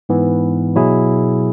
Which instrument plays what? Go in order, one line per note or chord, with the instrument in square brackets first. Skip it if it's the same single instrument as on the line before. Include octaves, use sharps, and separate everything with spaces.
[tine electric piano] G#2 E3 B3
B2 F#3 E4 G#4